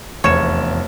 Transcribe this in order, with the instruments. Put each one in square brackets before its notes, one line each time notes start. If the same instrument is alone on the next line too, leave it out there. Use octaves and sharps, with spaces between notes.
[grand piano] F1 E7 [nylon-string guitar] E2 [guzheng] C#5